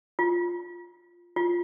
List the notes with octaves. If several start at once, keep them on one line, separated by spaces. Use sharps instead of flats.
F4
F4